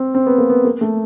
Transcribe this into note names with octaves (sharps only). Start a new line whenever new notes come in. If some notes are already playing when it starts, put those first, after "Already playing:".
Already playing: C4
C4
B3
A#3
B3
A#3
A3